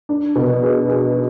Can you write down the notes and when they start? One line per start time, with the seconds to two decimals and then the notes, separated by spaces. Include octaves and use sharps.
0.09 D4
0.36 B2
0.62 G#4
0.89 G#4